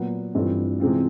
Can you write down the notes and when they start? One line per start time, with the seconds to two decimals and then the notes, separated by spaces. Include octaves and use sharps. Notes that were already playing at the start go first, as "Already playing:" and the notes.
Already playing: A#2 F#3 B3
0.35 G2 E3 A3 C4 F4
0.80 C3 E3 G#3 C4 F4